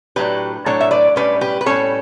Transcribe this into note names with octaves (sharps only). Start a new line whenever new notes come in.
A2 F#3 A3 D4 G4 B4
A2 F#3 A3 D4 A4 C#5
E5
B4 D5
A2 G3 C#4 B4 D5
G4 B4
B4
A2 G3 C#4 A4 C#5